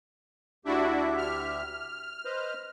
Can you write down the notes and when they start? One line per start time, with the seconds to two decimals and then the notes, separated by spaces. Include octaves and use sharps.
0.65 D2 D4 E4 F#4 G4 E5
1.17 F6
2.25 B4 C5 D#5